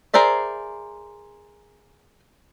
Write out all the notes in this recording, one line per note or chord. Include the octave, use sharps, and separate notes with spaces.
G#4 A#4 C5 D5 E5